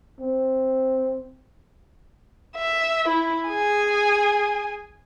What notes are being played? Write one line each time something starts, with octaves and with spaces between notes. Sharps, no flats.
C4
E5
E4
G#4 G#5